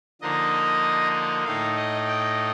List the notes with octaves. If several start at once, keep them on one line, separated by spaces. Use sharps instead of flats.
D3 F3 A#3 D#4 D#5
A2 A3 D#4 F5
D#5
G5